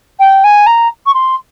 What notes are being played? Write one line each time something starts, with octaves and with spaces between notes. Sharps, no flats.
G5
G#5
A#5
C#6
C6